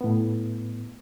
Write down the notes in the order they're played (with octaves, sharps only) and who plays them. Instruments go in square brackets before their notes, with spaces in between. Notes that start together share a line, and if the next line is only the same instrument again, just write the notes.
[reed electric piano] A2 B3